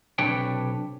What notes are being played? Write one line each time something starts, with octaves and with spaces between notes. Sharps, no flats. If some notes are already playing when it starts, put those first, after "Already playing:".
B1 C3 D4 B4 C#5 G5